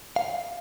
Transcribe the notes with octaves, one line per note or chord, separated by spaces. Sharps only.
F5